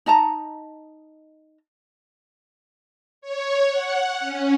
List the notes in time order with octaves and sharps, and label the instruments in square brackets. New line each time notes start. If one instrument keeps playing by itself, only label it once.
[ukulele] D#4 D#5 A5 A#5
[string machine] C#5
F#5
C#4